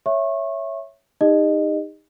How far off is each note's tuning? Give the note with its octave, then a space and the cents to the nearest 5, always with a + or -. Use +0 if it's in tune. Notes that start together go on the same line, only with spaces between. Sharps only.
C#5 +0 E5 +0 C#6 -30
D#4 +0 G4 +45 D#5 -20